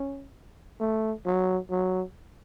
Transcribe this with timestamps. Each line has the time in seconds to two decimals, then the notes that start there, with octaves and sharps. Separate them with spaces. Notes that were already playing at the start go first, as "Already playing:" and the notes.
Already playing: C#4
0.81 A3
1.26 F#3
1.71 F#3